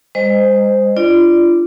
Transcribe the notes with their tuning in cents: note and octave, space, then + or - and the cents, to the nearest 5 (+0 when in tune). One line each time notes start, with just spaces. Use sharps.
G#3 -40 C5 -10 D#5 -10
D4 +0 F4 -30 D5 +0